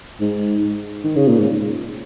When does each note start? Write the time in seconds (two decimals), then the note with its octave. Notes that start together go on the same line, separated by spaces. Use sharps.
0.21 G#2
1.04 D#3
1.16 C#3
1.28 A#2
1.39 G#2